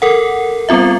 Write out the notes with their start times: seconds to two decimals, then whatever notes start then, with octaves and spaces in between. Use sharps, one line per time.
0.02 A4 A#4 F#5
0.69 G3 B3 C4 F4 E5